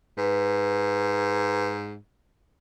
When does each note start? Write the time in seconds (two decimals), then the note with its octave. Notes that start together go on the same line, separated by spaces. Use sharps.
0.18 G#2 B4